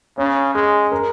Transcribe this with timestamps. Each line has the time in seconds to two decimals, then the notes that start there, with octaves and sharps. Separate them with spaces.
0.18 C#3 C#4
0.55 G#3 G#4
0.92 A#4